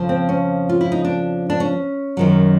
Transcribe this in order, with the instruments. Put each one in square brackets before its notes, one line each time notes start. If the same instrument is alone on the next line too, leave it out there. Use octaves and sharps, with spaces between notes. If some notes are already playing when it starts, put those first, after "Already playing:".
Already playing: [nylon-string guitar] F2 C#3 F3
C4
C#4
F4
E4
D#4
D4
D4
C#4
F#2 D#3 F#3